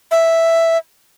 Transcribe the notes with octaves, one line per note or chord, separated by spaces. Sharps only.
E5